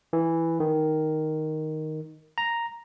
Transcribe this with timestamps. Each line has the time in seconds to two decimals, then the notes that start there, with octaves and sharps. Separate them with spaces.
0.13 E3
0.60 D#3
2.38 A#5